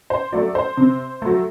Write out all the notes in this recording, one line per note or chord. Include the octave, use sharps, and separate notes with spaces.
C5
F#3 A3 D5
C5
C3
F#3 A3